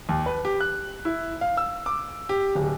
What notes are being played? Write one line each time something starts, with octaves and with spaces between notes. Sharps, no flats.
D#2
B4
G4
F#6
E4
F5
E6
D6
G4
D1